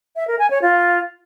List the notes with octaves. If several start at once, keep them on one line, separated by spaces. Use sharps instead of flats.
E5
A#4
G#5
C#5
F4